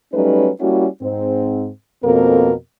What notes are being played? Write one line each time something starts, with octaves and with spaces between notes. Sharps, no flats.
F#3 G3 A3 C#4 D#4 B4
G3 A#3 C#4 E4 F#4
G#2 C4
F2 B2 A#3 C4 A4 A#4